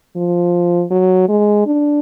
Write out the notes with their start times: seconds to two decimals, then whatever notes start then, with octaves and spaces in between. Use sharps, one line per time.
0.16 F3
0.91 F#3
1.29 G#3
1.67 D4